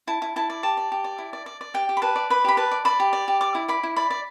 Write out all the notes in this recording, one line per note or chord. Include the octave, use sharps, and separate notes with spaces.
E4 A5
E4
E4 A5
D5
G4 A5
D5
G4
D5
E4
D5
D5
D5
G4 G5
G4
B5
B4 A5
D5
B4 B5
G4 B5
B4 A5
D5
D5 B5
G4
D5
G4
D5 D6
E4
D5 B5
E4
D5 B5
D5